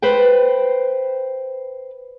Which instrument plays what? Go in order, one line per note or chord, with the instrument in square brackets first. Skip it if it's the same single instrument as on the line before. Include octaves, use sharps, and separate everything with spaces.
[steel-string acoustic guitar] B4 C5 G5